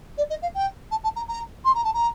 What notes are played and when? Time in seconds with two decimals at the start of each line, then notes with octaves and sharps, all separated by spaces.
0.17 D5
0.30 D#5
0.42 F5
0.54 G5
0.91 A5
1.03 A5
1.16 A#5
1.28 A#5
1.65 C6
1.74 A#5
1.84 A5
1.93 A#5